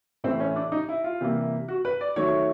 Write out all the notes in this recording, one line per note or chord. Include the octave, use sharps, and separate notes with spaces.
A2 E3 A3 C4
C#4
D4
D#4
E4
F4
C3 E3 G3 A#3
F#4
B4
D5
D#3 F#3 A3 C#5